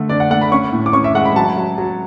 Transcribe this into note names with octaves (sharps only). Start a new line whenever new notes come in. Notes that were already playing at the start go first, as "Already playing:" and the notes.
Already playing: D3 A3
D4 D5
F#5
A3 F#5
B5
C#4 C#6
A2
D6
C#4 C#6
E5
G#3 F#5
B5
F#3 A5
F#3
F#3